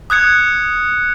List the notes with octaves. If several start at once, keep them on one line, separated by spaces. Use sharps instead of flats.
D#6 F#6 G#6 C#7